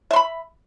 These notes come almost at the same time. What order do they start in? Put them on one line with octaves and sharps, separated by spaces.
E5 C6 B5